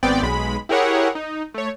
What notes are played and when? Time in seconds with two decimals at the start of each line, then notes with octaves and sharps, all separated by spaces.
0.03 G#1 B3 C4 D5 G5
0.23 B1 G#3 B5
0.69 E4 G4 G#4 A#4 C#5 F#5
1.15 D#4
1.54 A3 C#5